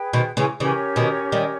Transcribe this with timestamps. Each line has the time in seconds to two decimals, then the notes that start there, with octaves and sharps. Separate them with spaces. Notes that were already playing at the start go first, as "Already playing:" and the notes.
Already playing: G#4 B4 G5
0.13 B2 D#3
0.37 C#3 E3
0.60 C#3 E3 C#4 G4 A#4 C#5
0.96 B2 D#3
1.32 D#3 G3